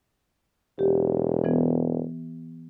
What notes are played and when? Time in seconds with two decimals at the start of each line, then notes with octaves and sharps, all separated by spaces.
0.79 E1 G4
1.44 E3 B3